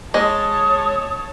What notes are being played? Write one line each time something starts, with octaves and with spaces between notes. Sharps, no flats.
G#3 C#5 D#5 A5 D#6